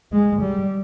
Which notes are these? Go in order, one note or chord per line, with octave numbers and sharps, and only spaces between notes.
G#3
G3